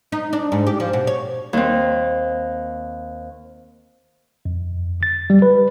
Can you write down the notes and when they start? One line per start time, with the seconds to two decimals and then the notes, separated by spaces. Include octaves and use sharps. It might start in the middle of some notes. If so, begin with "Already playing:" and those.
0.12 D#4
0.33 D4
0.52 G#2
0.67 G4
0.80 F3
0.93 B2
1.07 C#5
1.53 D#2 C4
4.45 F2
5.03 A6
5.30 G3
5.42 B4